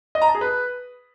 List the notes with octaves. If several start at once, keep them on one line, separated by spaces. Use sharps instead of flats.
D#5
A#5
A5
G#4
B4